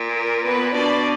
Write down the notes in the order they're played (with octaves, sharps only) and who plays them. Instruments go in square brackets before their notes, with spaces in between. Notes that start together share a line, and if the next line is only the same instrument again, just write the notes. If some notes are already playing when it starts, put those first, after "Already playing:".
Already playing: [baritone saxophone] A#2
[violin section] A#4
B3 B4
[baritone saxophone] B2 [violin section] D4 D5